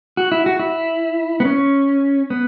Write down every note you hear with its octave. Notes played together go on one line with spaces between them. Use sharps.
F#4
E4
F#4
E4
B3
C#4
B3